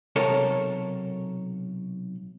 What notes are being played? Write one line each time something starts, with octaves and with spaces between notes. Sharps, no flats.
B1 C3 A4 A#4 C#5